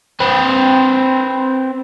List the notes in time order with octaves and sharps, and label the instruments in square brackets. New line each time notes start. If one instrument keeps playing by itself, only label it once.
[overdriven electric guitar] C4 B4